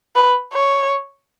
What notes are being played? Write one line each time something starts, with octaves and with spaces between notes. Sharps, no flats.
B4
C#5